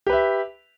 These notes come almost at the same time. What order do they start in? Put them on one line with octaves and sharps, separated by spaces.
G4 B4 E5